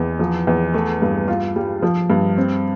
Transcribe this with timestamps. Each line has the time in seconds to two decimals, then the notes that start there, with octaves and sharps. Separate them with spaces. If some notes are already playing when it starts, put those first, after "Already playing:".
Already playing: E2
0.19 F3
0.47 E2
0.74 A3
1.02 G2
1.28 F4
1.56 G3
1.83 F3
2.10 G2
2.37 C4